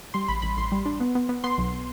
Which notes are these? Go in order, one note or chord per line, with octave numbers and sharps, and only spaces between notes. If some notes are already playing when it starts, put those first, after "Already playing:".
G3 C6
A1 B5
A1 B5
A1 C6
G3
D4
B3
B3
B3
B3 C6
B1